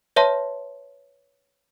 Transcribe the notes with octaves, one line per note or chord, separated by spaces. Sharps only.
B4 C#5 E5 A5 C6